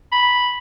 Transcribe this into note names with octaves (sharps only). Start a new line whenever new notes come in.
B5